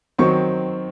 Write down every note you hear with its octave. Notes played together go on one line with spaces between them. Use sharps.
D#3 F#3 C4 C#6